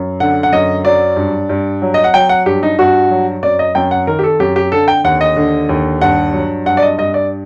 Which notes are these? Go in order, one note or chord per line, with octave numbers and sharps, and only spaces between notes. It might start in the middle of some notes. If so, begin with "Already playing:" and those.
Already playing: F#2
D3 F#5
F#5
F#2 D#5
F#3 D5
G2
G2
F#3
D#5
F#5
F#3 G5
F#5
G2 G4
D#4
G2 F#4
F#3
F#2 D5
D#5
F#2 G5
F#5
D#3 A#4
G4
A4
F#2 G4
G4
D3 A4
G5
D#2 F#5
D#5
D3
D#2
G2 F#5
F#3
G2 F#5
D5
D#5
G2 D#5
D5